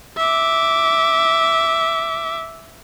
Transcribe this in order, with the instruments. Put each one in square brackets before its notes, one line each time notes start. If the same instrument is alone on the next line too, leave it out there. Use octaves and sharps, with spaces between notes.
[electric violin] E5 D6